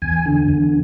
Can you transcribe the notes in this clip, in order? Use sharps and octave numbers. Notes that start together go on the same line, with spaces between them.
E2 G#5
D3
E2